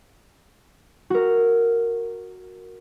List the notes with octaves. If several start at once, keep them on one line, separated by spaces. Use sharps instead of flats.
F#4 A#4